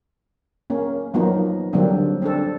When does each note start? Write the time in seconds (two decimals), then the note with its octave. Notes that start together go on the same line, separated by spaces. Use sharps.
0.70 A#3 C#4
1.14 F3 F#3 A#3 B3 D#4
1.73 D3 F#3 G3 A#3 C4 D4
2.22 C4 D4 A4